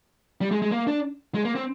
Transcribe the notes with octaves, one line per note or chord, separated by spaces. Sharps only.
G3
G#3
G#3
A#3
D4
G#3
A#3
C4